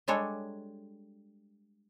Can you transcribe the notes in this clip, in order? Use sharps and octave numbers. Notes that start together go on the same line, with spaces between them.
G3 G#3 D4 A4 C#5